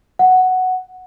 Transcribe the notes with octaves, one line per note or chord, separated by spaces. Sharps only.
F#5